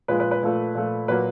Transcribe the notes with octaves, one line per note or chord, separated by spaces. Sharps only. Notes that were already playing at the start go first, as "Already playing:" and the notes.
A#2 F3 G#3 B4
B4
B4
A#2 F3 A3
A#2 F3 A3
A#2 F#3 A#3 B4